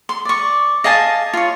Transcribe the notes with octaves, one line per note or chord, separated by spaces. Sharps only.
C6
D5 C#6
D#5 F5 G#5 A5
F4 C#5